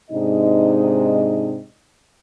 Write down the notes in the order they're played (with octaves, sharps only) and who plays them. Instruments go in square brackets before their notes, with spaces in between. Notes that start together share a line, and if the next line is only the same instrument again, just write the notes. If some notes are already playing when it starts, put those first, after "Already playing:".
[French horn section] G#2 C3 D4 D#4 D#5